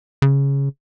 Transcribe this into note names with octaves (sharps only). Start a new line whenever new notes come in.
C#3